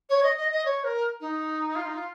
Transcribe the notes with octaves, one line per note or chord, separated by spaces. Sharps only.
C#5
D#5
D#5
D#5
C#5
A#4
D#4
F4
D#4
F4